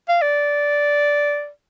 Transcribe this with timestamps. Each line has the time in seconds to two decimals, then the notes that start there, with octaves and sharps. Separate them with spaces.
0.09 F5
0.22 D5